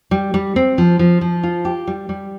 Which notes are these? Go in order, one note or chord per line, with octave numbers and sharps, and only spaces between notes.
G3
G3
C4
F3
F3
F3
F4
G4
G3
G3